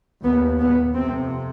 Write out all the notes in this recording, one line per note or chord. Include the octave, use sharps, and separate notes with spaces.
D#2 B3
B3
F2 C3 C4